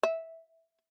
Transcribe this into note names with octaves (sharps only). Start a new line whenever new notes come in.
E5